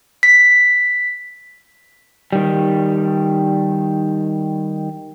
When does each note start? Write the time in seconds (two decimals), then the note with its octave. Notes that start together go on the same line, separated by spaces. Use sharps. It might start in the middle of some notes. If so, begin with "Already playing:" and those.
0.23 B6
2.33 D#3 G3